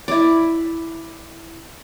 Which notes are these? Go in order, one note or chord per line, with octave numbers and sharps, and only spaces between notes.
E4 D5